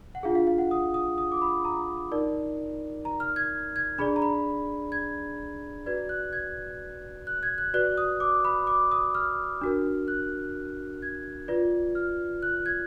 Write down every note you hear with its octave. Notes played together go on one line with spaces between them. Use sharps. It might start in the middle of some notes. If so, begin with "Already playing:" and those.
F#5
D4 F4 G#4 F5
F5
F5
F#5
D#6
D#6
D#6
D6
B5
A#5
D#4 A#4 D5
A#5
F6
G#6
G#6
D4 G#4 D5 B5
A#5
B5
G#6
F#4 B4 D5 G#6
F#6
G#6
F#6
G#6
F#6
F#4 B4 D5 F#6
D#6
D6
B5
D6
D#6
F6
D4 F#4 A#4
F#6
G#6
F4 B4 D5
F6
F#6
G#6